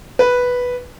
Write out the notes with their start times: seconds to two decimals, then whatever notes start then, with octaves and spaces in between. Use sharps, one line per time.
0.19 B4